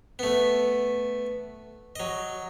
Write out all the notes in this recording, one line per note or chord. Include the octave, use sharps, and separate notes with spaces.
A3 B3
F#3 D#5